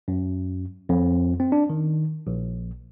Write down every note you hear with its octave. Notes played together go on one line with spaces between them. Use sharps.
F#2
F2
C4
D4
D#3
A#1